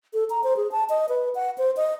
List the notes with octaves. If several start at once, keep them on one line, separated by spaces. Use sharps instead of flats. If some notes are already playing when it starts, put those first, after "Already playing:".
A4
A#5
C5
G#4
A5
D#5
B4
F#5
C5
D#5